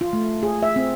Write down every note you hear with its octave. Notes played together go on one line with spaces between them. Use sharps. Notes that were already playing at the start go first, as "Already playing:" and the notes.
F4
A3
G#4
E5
C4